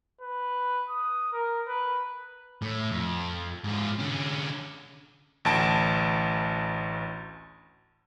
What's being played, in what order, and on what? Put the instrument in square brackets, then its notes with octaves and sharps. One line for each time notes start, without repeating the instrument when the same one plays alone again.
[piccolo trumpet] B4
D#6
A#4
B4
[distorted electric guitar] A2
F2
G#2 F4
D3 C#4
[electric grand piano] A1 D2 A5 D7